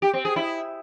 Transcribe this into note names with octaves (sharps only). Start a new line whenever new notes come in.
G4
C4
G#4
E4